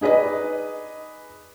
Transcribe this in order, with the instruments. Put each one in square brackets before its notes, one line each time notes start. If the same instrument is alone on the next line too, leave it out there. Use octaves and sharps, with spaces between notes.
[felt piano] D#4 G#4 B4 D5 D#5